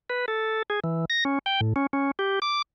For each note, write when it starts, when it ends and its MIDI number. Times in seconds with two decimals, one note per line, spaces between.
0.10 0.25 71
0.28 0.62 69
0.70 0.80 68
0.84 1.05 52
1.10 1.24 94
1.25 1.39 61
1.46 1.61 79
1.61 1.73 45
1.76 1.87 61
1.93 2.11 61
2.19 2.39 67
2.42 2.62 86